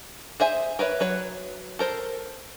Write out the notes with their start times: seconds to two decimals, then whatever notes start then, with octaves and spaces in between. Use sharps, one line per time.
0.40 G#4 C5 E5 G#5
0.79 A#4 B4 C#5 E5
1.00 F#3 B4 C#5
1.79 A4 A#4 C5